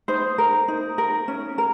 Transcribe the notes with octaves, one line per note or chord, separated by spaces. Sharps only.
D#4 C5
A#4
D#4
A#4
C#4
A#4